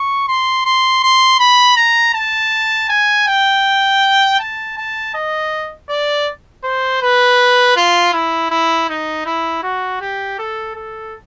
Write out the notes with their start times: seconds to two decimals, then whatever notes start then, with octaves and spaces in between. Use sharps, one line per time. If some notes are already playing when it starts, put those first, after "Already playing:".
Already playing: C#6
0.28 C6
0.65 C6
1.03 C6
1.39 B5
1.77 A#5
2.14 A5
2.89 G#5
3.27 G5
4.39 A5
4.77 A5
5.14 D#5
5.90 D5
6.64 C5
7.02 B4
7.77 F4
8.13 E4
8.51 E4
8.89 D#4
9.26 E4
9.63 F#4
10.01 G4
10.39 A4
10.76 A4